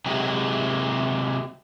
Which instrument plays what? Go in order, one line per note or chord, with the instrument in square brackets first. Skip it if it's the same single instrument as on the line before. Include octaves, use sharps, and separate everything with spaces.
[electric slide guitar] C3 F#3 G#3 D#4 E4 G4